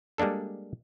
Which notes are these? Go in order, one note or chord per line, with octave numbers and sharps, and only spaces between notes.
G3 G#3 A#3 D4 A4